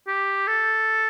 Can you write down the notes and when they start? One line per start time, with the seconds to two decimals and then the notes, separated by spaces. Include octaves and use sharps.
0.08 G4
0.48 A4